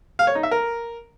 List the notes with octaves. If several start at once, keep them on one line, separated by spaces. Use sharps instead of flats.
F5
C#5
D#4
E5
A#4